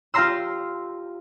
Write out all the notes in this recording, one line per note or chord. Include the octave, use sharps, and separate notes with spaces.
F4 G4 F5 A#5 C6 E6